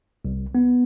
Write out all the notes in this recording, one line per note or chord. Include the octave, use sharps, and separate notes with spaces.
C2
B3